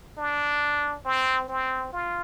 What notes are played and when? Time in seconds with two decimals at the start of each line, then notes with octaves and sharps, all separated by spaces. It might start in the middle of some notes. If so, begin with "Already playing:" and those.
0.18 D4
1.05 C4
1.49 C4
1.93 F4